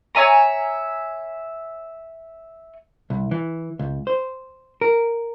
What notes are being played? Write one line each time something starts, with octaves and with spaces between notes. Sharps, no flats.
C#5 E5 G#5 A#5
C2
E3
C#2
C5
A#4